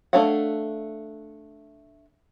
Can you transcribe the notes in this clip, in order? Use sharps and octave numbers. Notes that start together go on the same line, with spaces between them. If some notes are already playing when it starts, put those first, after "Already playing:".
A3 D4 C#5 F5 F#5